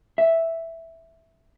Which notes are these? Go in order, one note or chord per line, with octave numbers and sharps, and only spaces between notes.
E5